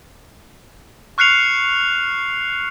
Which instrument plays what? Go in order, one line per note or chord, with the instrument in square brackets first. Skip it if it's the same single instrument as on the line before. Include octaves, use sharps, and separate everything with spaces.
[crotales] C#6 F6 F#6 C7 C#7 F7